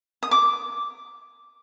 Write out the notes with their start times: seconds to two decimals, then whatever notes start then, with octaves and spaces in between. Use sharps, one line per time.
0.23 D#6
0.31 D6